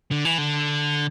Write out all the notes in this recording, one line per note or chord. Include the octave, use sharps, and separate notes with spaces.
D3
E3
D3